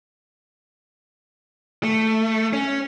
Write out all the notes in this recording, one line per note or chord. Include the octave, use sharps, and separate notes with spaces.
A3
C#4